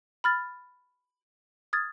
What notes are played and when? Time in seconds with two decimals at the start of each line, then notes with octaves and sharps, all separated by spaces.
0.24 B5 F6 A6
1.73 D#6 F6 G#6 A6